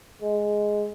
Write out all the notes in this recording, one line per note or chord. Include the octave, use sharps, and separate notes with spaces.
G#3